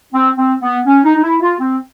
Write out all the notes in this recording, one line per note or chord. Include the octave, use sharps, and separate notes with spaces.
C4
C4
B3
C#4
D#4
D#4
E4
F4
C4